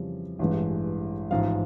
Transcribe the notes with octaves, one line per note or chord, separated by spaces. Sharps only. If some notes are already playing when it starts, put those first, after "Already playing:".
Already playing: F2 C#3 E3 G3
A1 G2 E3 G#3
A1 G#2 F3 F5